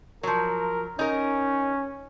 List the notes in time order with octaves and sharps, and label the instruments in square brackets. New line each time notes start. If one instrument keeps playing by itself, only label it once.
[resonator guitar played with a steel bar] F3 F#3 [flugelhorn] A#4
[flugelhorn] C#4 [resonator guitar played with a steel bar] D#4 A#4